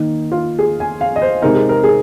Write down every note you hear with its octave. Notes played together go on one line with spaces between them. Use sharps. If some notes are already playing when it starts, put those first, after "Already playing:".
Already playing: D#3 A#3 D#4
F4
G#4
G#5
F5
D#5
C5
C3 G#3 C4 D#4 A#4
G#4
A#4
G#4